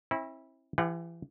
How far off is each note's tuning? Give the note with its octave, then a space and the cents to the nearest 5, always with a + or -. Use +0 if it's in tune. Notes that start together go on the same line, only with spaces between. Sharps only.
C4 +40 E4 -20
E3 +35 G4 +40 F#5 -5